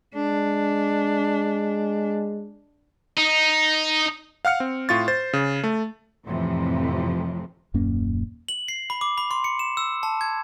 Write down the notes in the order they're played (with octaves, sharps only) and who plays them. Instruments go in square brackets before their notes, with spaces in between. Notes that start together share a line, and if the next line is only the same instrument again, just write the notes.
[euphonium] G#3 [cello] D4
[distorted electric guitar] D#4
[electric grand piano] F5 F#5 F6 C#7
C4
A2 F4 C#6 A6
C5 A6
C#3
A3
[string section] F2 A2 C3 E3 F3
[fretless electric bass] D#1 F#2 A#3 C#4
[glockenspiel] F#7
C7
B5
D6
B5
C6
C#7
E7
E6
A5
G#6